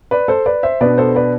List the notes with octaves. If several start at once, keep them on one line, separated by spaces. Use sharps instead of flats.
B4 D5
A4 C5
B4 D5
C5 E5
B2 B3 D4 B4 D5
A4 C5
B4 D5